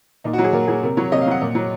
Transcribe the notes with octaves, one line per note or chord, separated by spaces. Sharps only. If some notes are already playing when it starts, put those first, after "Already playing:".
A#2 D#4
F#4
F#3
G#4
A#2 A#4
F#3 G#4
C3 A#4
F#3 C#5
C3 D#5
F5
F#3 F#5
A#2
F#3